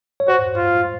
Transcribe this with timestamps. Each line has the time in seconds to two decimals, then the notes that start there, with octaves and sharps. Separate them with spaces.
0.20 C#5
0.28 F#4 C5
0.56 F4